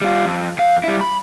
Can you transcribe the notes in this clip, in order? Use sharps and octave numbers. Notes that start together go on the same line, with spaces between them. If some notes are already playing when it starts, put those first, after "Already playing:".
G3 F4
F2
F2 F5
G3 E4
B5